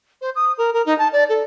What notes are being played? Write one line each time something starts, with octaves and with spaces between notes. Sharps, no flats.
C5
D#6
A#4
A#4
D#4
A5
D5
A4